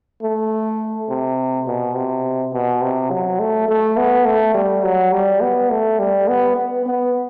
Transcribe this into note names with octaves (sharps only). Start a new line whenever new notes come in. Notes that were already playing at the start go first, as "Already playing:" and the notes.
A3
C3
B2
C3
B2
C3
F#3
A3
A3
B3
A3
G3
F#3
G3
B3
A3
G3
B3
B3
B3